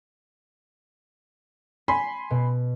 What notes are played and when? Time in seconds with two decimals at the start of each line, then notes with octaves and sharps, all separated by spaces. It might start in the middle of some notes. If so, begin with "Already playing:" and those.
1.88 G#5 B5 C6 B6
2.30 B2